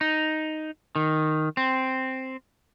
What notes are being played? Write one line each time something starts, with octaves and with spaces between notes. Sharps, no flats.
D#4
D#3
C4